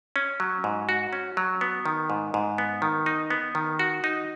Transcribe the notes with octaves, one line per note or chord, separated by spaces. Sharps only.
C#4
F#3
G#2
F#4
C#4
F#3
B3
D#3
G#2
G#2
B3
D#3
D#4
B3
D#3
F#4
D#4